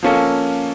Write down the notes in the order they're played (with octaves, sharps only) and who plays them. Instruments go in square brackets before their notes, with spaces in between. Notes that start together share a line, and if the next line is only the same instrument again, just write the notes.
[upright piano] F3 A#3 C#4 A4